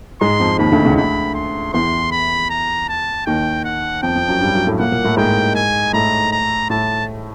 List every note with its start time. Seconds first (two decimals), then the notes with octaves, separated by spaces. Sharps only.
0.21 G#2 G#3 C6
0.40 F2 F3
0.59 D#2 D#3 B5
0.72 D2 D3
0.85 C#2 C#3
0.97 D2 D3 B5
1.35 C6
1.73 E2 E3 C6
2.11 B5
2.50 A#5
2.89 A5
3.26 D#2 D#3 G5
3.65 F#5
4.02 F2 F3 G5
4.15 F2 F3
4.28 F#2 F#3
4.41 G2 G3
4.53 F#2 F#3
4.66 A2 A3
4.79 A#2 A#3 F#5
4.92 A#2 A#3
5.04 A2 A3
5.17 G#2 G#3 G5
5.55 G#5
5.93 A2 A3 A#5
6.32 A#5
6.70 A2 A3 A5